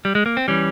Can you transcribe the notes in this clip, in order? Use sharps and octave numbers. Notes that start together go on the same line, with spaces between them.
G3
G#3
A#3
C4
E3 G3 C#4